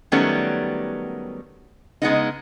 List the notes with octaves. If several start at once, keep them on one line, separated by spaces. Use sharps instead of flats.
D#3 F#3 G3 A3 B3 C#4
C#3 G#3 B3 D#4